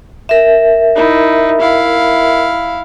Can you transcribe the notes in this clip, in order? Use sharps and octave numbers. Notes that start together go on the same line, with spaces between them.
A#4 E5
D#4 E4
E4 F5